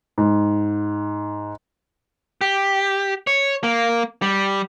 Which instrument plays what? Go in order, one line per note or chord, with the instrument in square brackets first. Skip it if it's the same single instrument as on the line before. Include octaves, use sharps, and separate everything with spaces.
[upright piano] G#2
[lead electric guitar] G4
C#5
A#3
G3